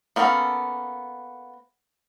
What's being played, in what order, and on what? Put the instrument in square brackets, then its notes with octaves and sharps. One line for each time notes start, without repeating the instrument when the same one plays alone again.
[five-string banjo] A#3 B3 C#4 F#4 A4